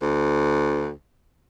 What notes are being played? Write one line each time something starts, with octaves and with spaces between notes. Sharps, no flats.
D2